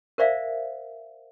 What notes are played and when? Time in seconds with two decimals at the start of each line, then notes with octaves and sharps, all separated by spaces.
0.18 A#4 C5 D5 E5 F5